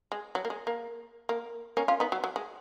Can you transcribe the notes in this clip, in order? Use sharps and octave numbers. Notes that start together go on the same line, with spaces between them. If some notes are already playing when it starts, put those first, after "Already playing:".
G#3
F#3
A#3
G#3
A#3
A#3
A#3 C#4
C#4 F4
B3 D#4
F#3
F#3
G#3